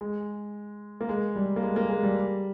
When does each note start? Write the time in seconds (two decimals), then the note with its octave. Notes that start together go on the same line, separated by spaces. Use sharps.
0.01 G#3
1.01 A#3
1.09 G#3
1.36 G3
1.56 A#3
1.63 G#3
1.76 A#3
1.90 G#3
2.03 G3